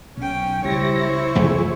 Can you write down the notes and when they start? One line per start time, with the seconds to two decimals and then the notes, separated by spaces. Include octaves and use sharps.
0.17 B1 C#4 G5
0.65 C#2 G3 E4 C5 C#5 A#6
1.35 C2 F2 E3 F3 A3 G#4